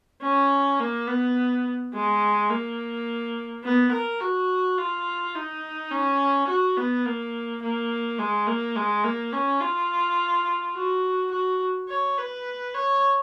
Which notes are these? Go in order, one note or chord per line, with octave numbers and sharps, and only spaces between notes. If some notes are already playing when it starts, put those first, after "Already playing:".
C#4
A#3
B3
G#3
A#3
B3
A#4
F#4
F4
D#4
C#4
F#4
B3
A#3
A#3
G#3
A#3
G#3
A#3
C#4
F4
F#4
F#4
C#5
B4
C#5